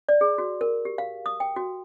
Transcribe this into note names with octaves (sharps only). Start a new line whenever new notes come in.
D5
G#4
F#4
A#4
G4
F5
D#6
G5
F#4